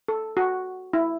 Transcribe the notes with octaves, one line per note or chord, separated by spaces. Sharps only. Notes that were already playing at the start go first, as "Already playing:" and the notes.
A4
F#4
E4